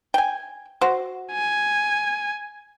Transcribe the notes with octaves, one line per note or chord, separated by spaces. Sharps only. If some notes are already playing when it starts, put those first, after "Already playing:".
G5 G#5
F#4 C5
G#5